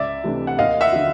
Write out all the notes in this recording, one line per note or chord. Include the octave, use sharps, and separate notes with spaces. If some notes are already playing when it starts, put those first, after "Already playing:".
Already playing: C#2 D5 E5
C3 E3 A3 D4
F#5
D#2 D#5 F5
E5 F#5
D3 F#3